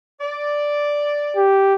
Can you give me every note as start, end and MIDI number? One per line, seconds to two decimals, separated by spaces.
0.21 1.41 74
1.36 1.75 67